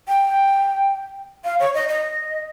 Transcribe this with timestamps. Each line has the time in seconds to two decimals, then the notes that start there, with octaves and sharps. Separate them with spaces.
0.08 G5
1.44 F5
1.60 C#5
1.74 D#5
1.89 D#5